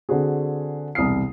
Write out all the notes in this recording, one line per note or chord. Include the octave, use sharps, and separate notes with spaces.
D3 C4 F#4 G#4
E1 C2 C3 D#6 F6 C7